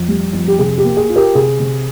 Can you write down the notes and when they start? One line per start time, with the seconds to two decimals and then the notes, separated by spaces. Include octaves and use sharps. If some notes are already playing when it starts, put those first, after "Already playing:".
Already playing: F2
0.08 G3
0.33 F2
0.48 G4
0.58 C3 G#4
0.78 G4
0.84 A#3
0.97 G#4
1.09 F4
1.16 G4 A#4
1.35 C3 G#4
1.60 C3